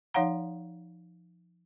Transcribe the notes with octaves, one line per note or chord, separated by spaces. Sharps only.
F3 D#4 C#5 F5 F#5 A#5